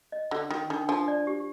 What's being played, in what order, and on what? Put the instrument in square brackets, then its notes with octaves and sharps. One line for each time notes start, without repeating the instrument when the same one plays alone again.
[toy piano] D#5
[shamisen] D3 [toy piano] F4
[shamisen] D#3 [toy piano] F4
[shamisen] D#3 [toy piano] D4
[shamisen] F3 [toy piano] D4
[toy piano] D5
G4